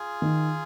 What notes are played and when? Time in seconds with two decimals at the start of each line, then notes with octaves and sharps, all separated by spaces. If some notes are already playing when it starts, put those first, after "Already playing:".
Already playing: F4 G#4
0.22 D#3